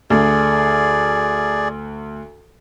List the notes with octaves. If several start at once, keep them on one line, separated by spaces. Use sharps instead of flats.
D2 G#4 D5